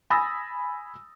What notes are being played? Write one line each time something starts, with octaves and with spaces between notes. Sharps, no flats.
G#5 B5 D#6 E6 A6 A#6